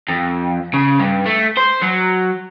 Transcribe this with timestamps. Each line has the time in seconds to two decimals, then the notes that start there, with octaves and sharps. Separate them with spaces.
0.09 F2
0.74 C#3
0.99 G2
1.26 A3
1.57 C5
1.82 F#3